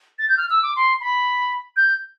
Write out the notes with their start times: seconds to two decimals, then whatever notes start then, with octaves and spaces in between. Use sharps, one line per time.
0.19 A6
0.29 G6
0.37 F6
0.50 E6
0.63 D6
0.76 C6
1.01 B5
1.76 G6